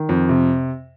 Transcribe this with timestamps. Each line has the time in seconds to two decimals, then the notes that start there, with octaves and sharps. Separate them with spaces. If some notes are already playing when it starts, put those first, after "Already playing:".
Already playing: D#3
0.09 F2
0.29 C3